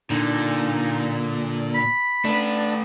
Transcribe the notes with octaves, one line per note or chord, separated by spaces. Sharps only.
A#2 D3 D#4
B5
A3 D4 B4